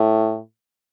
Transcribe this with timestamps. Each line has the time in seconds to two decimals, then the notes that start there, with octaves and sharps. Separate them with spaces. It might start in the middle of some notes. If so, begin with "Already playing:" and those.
Already playing: A2